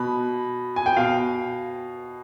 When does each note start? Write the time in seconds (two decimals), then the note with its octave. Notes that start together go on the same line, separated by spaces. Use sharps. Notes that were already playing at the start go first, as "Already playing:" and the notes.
Already playing: B2 B5
0.76 G#5
0.86 G5
0.97 B2 F5